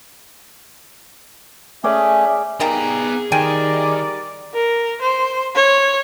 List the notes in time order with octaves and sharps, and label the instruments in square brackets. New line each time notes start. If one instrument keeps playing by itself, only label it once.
[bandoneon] A3 C#4 [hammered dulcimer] G#4 D5 G#5 [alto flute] E5
[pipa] D#3 G3 A#3 [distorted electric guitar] B3 A#5 [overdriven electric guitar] G#4
[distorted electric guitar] D#3 [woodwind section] G3 A#4 D5 [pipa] G5 G#5
[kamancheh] A#4
C5
C#5